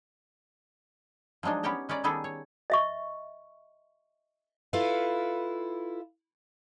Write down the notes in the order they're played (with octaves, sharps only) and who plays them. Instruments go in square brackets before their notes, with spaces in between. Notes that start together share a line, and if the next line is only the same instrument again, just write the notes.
[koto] F3 F#3 G#3 D4 D#4
B3 C#4 G4 C#5 G5 A#5
G#3 C#4 B4 D5 A#5
D#3 G3 B3 G#4 A4 G5
C#5
[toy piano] D#5 E5 C#6
[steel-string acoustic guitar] E4 F4 A4 B4 F5